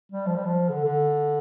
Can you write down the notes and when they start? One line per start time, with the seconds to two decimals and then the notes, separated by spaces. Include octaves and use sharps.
0.12 G3
0.27 F3
0.36 G3
0.45 F3
0.69 D3
0.84 D3